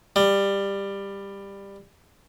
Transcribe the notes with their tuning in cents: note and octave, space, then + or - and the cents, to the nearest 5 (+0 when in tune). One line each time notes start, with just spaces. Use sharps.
G3 +15